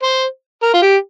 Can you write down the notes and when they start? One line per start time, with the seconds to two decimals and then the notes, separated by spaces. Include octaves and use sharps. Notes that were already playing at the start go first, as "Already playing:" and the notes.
0.03 C5
0.63 A#4
0.74 F4
0.82 G4